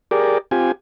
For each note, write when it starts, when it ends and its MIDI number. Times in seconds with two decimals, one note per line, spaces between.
0.11 0.38 67
0.11 0.38 68
0.11 0.38 70
0.11 0.38 74
0.51 0.72 60
0.51 0.72 65
0.51 0.72 67
0.51 0.72 80